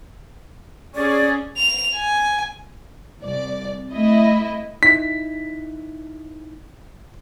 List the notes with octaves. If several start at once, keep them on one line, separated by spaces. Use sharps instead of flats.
C#4 G#4 D5
F7
G#5
C2 D5
A3 E4 D#5
D#4 E4 B6